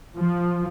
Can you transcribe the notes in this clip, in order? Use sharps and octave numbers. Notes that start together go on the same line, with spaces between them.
F3